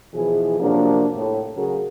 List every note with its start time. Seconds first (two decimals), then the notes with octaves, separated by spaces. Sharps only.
0.14 B2 E3 F3 E4 G#4
0.59 C3 F3 F#3 A#3 D4
1.15 A2
1.56 C#3 F#3 F#4 G#4 A#4